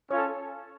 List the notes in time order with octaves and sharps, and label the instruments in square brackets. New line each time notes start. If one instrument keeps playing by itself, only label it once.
[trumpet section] C#4 F4 A4 [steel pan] C#5